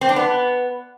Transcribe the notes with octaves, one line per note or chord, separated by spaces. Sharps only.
C4
D4
B3